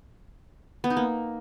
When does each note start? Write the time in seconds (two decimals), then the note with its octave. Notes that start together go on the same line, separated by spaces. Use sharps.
0.84 B3
0.90 D#4
0.97 A#3